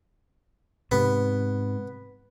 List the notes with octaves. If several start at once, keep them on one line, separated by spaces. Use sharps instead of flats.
G#2 C3 B3